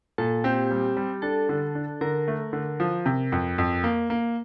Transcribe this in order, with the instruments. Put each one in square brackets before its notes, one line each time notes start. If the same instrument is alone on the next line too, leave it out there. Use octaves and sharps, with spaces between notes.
[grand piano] A#2 [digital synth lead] A4
[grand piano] C4 [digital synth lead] G4
[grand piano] G3
G3
[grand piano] D4 [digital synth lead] A4
[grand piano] D3
D4
[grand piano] D3 [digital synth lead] A#4
[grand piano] A3
D3
F3
C3
F2
F2
A#3
A#3